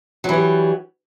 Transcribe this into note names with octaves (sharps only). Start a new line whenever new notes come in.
E3 F#3 G3